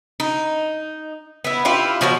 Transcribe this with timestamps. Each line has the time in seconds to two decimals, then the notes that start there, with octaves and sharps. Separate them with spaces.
0.20 D#4
1.44 B3 E4
1.65 E4 F4 G4
2.01 B2 F3 F#4 C#5